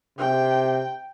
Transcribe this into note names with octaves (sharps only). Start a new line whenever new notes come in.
C3 G5